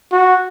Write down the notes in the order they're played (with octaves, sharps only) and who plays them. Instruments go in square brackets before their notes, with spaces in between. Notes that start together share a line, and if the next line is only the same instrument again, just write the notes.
[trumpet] F#4